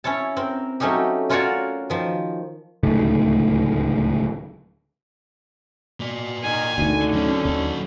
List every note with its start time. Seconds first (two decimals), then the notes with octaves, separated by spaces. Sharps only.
0.04 C#4 E4 C#5 A5
0.37 C4 A#4
0.80 F#3 A3 C#4 D#4 G4
1.29 C#4 F4 F#4 A#4 C#5 D5
1.90 D#3 F3
2.83 D1 C#2 D#3 A3
6.00 B2 A#3 D5
6.43 D#3 G#5
6.78 D2 D3 D#3
7.13 F#3 C4 C#4
7.45 D#2 F#3 A4